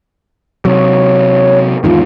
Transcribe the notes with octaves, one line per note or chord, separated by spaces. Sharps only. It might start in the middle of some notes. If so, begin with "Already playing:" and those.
C3 F#3 C#5
E2 G#2 D#3 F4